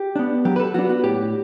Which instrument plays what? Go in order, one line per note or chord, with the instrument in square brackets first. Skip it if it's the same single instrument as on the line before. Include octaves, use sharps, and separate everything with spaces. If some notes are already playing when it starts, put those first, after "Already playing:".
Already playing: [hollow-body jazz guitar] G4
B3 D4
F#3 G4
B4
A4
B3 D4 F#4
F#4
A2 G4